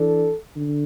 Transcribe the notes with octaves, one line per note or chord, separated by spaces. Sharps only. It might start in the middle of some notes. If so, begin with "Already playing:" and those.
Already playing: E3 D4 A4
D3